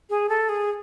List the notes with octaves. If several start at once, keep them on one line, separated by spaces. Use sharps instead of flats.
G#4
A4
G#4